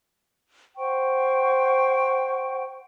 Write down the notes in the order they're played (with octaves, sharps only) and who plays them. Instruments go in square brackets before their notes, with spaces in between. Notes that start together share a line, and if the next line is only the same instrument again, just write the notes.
[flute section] C5 F#5 G5 C#6